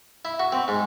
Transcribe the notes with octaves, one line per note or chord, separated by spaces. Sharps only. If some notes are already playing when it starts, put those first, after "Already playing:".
E4
F#4
C4
G#2